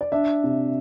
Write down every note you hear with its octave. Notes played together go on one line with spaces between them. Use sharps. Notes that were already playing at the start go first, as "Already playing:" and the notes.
D5
D4 E5
C3